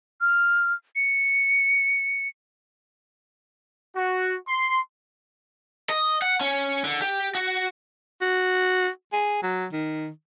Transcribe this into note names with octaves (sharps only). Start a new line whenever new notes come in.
F6
C#7
F#4
C6
D#5
F#5
C#4
D3
G4
F#4
F#4
G#4
F#3
D#3